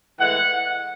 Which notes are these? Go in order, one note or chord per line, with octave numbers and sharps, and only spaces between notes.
A2 E3 G#3 F#5